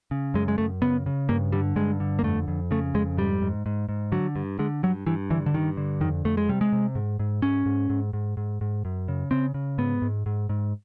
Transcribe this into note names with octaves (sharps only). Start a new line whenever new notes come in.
C#3
F#2 G#3
G#3
F#2 A3
C#3 B3
C#3
G2 A#3
D3 G3
G2 G#3
D3
A#3
F2 A3
F2
C#3 A3
F2 G#3
G#2 G3
G#2
G#2
G#2
D3 F#3
G2
D3 G#3
G2 F#3
G2 E3
D3 E3
D3
G2 D#3
D3
F2 D#3
F2 A3
G#3
C3 G3
G#3
C3
G#2
G#2
G#2 C#4
G#2
G#2
G#2
G#2
G#2
F#2
C#3
C#3 C4
C#3
G#2 B3
G#2
G#2
G#2